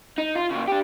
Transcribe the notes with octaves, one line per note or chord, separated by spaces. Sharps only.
D#4
F4
C#3 A#3
D4 G4